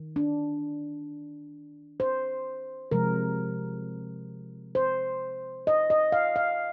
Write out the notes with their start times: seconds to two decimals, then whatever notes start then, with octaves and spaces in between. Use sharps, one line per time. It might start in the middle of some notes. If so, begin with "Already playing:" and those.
Already playing: D#3
0.16 D4
2.00 C5
2.91 C3 F3 G#3 A#4
4.75 C5
5.67 D#5
5.90 D#5
6.12 F5
6.36 F5